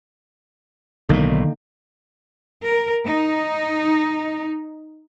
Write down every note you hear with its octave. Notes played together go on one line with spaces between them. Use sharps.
B1 A2 D3 D#3 A#3
A#4
D#4